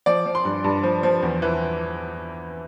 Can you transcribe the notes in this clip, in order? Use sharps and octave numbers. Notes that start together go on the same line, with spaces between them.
F3 D5
F3
C6
G2
G2
F3
F3
E2
E3